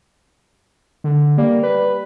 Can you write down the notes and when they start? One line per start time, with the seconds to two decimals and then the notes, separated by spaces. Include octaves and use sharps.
1.04 D3
1.38 G3 A#3
1.63 B4